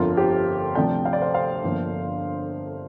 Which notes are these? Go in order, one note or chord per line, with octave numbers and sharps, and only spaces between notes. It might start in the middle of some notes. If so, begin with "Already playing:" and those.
Already playing: G1 F2 D3 F3 F4 A#4
G4 C5
D2 C3 F3 D5 G5
F5
D5
C5 F5
C5 F5
G1 G2 F3 A#3